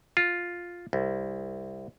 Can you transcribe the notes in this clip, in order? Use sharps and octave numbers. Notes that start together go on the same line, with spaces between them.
F4
C2